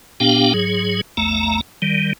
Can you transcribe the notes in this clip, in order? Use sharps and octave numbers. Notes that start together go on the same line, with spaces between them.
A#2 B3 D4 G4 F5 G5
G#2 F#3 G#4
A#1 E2 A3 A#5
D#3 G3